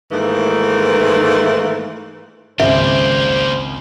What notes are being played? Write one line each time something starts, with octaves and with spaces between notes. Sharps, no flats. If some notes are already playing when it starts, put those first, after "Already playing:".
G#2 D#3 E3 A3 A#3
G#1 C#2 A#3 G4 C5 E5